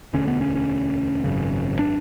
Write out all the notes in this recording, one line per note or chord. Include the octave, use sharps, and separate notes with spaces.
E1 D2 D3 C#4
B3
C#4
C#4
G#1 F#2 C#3
D4